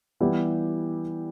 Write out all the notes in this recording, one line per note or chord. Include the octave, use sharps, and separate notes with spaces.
E3 G3 B3 E4 G4